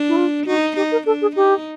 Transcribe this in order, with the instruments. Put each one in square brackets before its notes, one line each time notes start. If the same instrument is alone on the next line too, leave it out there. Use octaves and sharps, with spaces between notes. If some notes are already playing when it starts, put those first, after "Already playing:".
Already playing: [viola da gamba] D4
[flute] E4
F4
[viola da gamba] D#4 [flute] F#4
[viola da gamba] D#4 [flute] G4
[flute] A#4
[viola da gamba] D4 [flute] A4
[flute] G#4
[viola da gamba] D#4 [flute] G4